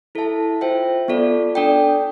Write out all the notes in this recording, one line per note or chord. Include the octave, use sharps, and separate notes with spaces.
E4 A4 E5 A5
F4 C5 E5 G5
B3 F4 A4 D5
D4 A4 D5 G5